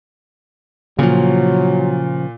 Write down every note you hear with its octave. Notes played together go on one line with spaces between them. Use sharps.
A#2 C#3 F3 F#3